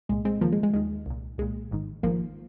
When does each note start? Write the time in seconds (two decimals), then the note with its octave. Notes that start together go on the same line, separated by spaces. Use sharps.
0.09 C2 A#2 G#3
0.25 G#3 C4
0.41 D#2 D#3 F3 A#3
0.53 G#3
0.63 G#3
0.74 D#2 D#3 G#3
1.06 C2 A#2
1.38 C2 A#2 G#3
1.71 G#1 G#2 D#3
2.03 G#1 G#2 D#3 F3 A#3